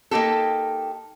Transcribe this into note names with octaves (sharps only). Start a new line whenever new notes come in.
A#3 D#4 G4 A4